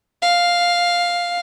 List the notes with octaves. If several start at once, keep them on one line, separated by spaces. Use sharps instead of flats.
F5